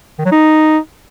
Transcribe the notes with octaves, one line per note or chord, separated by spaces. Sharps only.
D#3
F#3
D#4